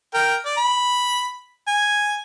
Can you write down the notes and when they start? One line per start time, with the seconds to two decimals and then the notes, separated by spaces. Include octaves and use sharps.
0.14 A#4 G5
0.45 D5
0.57 B5
1.67 G#5